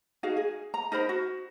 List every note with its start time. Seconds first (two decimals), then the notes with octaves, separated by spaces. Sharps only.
0.23 D#4 F#4 G#4 F5
0.37 G#4
0.74 A#5
0.92 D#4 A#4 C5 B5
1.09 F#4